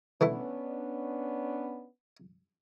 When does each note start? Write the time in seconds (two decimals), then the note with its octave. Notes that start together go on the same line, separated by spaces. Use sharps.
0.21 E3 A3 B3 C#4 D4 E4